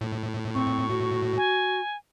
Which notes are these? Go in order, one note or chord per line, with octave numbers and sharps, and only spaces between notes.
A2
C4 C#6
F#4
G#5